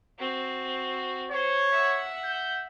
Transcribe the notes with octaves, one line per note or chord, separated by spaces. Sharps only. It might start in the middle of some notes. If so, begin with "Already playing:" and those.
C4 F#4
C5 C#5
E5 F#5
G6